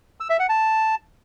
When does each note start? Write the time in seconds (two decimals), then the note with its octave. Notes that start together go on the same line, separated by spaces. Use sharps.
0.20 E6
0.30 E5
0.39 F#5
0.49 A5